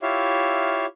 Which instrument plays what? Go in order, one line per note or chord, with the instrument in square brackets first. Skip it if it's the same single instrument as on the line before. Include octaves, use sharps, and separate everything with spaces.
[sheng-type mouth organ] E4 F4 G4 C#5 E5 F5